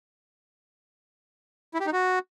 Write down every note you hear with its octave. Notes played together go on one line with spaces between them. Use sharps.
E4
G4
D#4
F#4